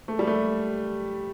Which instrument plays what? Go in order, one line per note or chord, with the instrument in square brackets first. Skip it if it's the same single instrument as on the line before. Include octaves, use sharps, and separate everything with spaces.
[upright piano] A3
G3
A3